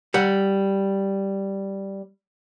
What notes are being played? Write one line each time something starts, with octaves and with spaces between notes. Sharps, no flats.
G3 F#5